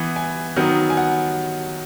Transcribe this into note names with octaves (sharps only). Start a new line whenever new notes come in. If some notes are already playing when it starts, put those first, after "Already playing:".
Already playing: E3 B3
G#5
D#3 F#3 B3
G#5
F#5